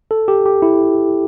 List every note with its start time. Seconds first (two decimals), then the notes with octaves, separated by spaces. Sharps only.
0.11 A4
0.28 G4
0.46 G4
0.62 E4